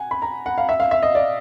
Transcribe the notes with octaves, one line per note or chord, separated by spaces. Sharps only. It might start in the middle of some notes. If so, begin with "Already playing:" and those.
Already playing: F#5 G#5
B5
A#5
F#5
F5
E5
F5
E5
D#5
D5